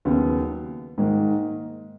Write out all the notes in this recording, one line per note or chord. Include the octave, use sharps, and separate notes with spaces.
D#2 C#3 F#3 B3
G#2 D#3 A#3